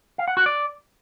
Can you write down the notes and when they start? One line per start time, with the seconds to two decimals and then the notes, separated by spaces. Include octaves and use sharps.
0.18 F5
0.28 F#5
0.37 F#4
0.46 D5